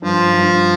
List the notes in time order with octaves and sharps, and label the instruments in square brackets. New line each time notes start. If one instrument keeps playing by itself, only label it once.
[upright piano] G2 [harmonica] F3
[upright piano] G2